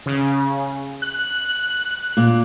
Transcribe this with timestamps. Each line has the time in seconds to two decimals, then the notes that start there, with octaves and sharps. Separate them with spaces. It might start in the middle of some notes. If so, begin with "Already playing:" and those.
0.06 C#3
1.02 F#6
2.17 A#2